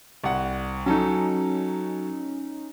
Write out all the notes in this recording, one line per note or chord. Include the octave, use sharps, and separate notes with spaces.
C2 F#5
F#3 C#4 D#4 A4